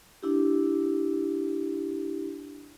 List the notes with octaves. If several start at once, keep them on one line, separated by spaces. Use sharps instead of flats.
D4 E4 G4